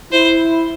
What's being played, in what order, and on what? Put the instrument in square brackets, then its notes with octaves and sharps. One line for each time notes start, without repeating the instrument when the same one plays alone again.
[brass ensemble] E4 [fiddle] C5